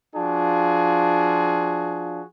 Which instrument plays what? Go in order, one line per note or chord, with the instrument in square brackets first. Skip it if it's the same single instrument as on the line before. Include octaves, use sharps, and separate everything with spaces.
[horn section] F3 D4 F4 F#4 G#4